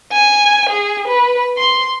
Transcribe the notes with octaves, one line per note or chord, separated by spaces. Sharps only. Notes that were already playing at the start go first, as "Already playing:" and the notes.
G#5
G#4
B4
C6